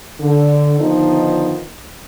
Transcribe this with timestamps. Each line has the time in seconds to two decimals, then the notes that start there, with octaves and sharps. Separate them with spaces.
0.20 D3
0.80 D3 D#3 F3 B3 D#4